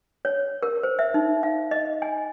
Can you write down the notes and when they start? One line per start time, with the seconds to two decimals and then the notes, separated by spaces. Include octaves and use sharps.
0.25 C#5
0.63 A#4
0.83 C5
0.99 E5
1.14 D#4
1.43 F5
1.71 D#5
2.02 G#5